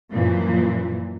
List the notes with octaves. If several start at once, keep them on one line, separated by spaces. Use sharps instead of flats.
F#2 A#2 E3 F3